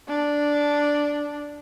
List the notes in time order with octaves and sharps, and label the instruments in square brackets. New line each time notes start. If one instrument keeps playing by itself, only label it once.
[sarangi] D4